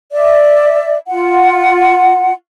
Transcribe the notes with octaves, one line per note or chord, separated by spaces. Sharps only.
D5 E5
F4 F#5